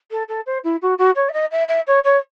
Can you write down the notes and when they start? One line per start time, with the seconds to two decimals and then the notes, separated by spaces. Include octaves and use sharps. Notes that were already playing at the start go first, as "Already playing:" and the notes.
0.11 A4
0.28 A4
0.46 C5
0.64 E4
0.82 F#4
0.98 F#4
1.16 C#5
1.29 E5
1.33 D#5
1.51 E5
1.68 E5
1.87 C#5
2.04 C#5